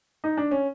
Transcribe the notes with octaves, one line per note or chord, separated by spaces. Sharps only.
D#4
D4
C#4